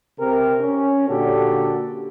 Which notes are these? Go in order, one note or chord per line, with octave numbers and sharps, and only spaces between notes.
C3 C4 G4 A#4
C#4
A#2 D3 F#4 G4 A4